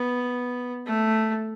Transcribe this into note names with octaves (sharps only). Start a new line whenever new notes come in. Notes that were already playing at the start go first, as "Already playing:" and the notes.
Already playing: B3
A3